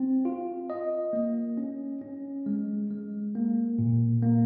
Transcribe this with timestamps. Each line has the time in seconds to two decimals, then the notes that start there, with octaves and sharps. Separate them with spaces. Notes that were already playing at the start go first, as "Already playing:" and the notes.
Already playing: C4
0.25 F4
0.70 D#5
1.13 A#3
1.57 C#4
2.01 C#4
2.46 G#3
2.90 G#3
3.35 A#3
3.79 A#2
4.23 A#3